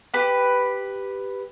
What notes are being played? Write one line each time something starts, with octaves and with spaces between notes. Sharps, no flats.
G4 B4